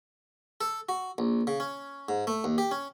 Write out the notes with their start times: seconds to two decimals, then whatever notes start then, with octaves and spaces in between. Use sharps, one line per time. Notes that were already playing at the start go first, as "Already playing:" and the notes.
0.61 A4
0.89 F#4
1.18 A#1
1.47 C#3
1.60 C#4
2.09 G#2
2.27 A3
2.44 D#2
2.58 G4
2.71 C#4